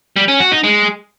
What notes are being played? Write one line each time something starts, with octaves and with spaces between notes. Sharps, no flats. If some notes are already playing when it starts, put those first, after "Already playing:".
G3
C#4
F#4
D#4
G#3